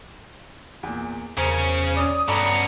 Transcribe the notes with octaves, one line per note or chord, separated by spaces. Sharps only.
E2 A#2
E2 C#3 C#4 A#4 C5 A#5
C#5 D5 D#6
G2 C#3 B3 A4 D5 A#5 B5